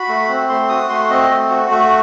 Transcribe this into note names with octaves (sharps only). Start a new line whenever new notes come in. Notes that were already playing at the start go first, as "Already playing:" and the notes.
Already playing: F#4 B5
A3
C4
A3 C6
F#4 D#6
A3 C6
C4 D#5
A3
F#4
A3